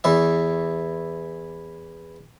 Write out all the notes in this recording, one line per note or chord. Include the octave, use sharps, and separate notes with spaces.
E2 E3 E5